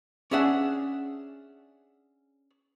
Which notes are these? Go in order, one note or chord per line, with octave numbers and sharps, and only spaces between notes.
C#4 D4 G#4 E5 F#5